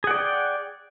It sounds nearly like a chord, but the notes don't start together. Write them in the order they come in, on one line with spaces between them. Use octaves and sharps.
G#4 F#5 D5 G5